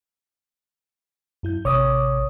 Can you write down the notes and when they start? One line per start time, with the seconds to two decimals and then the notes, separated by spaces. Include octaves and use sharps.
1.43 F#2 E4 G6
1.65 A1 C3 C#5 D6 D#6